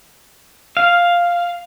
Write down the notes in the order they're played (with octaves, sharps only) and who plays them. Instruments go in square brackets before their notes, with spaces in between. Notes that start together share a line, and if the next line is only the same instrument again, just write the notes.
[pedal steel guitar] F5